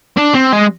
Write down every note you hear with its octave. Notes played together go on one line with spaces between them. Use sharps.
D4
C4
G#3